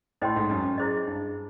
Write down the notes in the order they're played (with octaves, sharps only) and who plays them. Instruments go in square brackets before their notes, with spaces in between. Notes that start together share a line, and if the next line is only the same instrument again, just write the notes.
[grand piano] A2 [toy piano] C5 D#5 G5 C6
[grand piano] G#2
F#2
F#2
[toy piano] E4 G#4 C5 D#5
[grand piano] G2